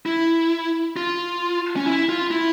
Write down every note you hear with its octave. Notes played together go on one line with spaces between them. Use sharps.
E4
F4
C#4
E4
F4
E4